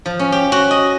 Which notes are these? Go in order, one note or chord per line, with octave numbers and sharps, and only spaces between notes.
F3
C#4
G4
F#4
D#5